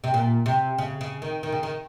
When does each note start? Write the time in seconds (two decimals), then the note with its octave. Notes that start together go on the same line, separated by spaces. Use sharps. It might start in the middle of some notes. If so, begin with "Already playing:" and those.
0.04 C3
0.14 A#2
0.46 C3
0.78 C#3
1.01 C#3
1.22 D#3
1.43 D#3
1.52 C#3
1.63 D#3